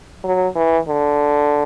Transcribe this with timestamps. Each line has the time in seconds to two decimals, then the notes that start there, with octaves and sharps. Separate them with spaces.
0.24 F#3
0.56 E3
0.88 D3